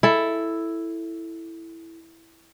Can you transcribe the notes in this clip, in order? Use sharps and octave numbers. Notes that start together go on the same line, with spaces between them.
E4 A4